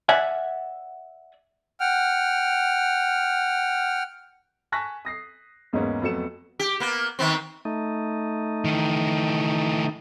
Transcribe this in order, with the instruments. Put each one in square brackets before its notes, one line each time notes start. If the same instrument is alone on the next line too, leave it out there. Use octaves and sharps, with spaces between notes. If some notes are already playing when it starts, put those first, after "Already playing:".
[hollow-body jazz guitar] D5 E5 F#5 G#5
[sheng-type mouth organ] F#5 G5 F6
[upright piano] G#5 A5 C#6 F#6 A#6 B6
D#6 A#6 C7
E2 G#2 G#3 A#3 B3 C#4
F2 F#3 A3 B3 C#7 E7
[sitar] G4
A#3 B3
D#3 B3 C4
[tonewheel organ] A3 D#4
[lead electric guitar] D#3 E3